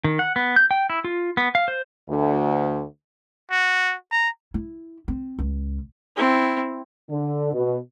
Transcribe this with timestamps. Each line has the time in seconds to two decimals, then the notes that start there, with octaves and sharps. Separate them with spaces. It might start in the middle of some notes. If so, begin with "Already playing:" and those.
0.04 D#3
0.19 F#5
0.36 B3
0.56 G6
0.71 G5
0.90 E4
1.04 F4
1.37 B3
1.55 F5
1.68 C5
2.09 D2
3.51 F#4
4.12 A#5
4.54 E4
5.08 C4
5.39 C#2
6.16 C4 E4
7.09 D3
7.52 B2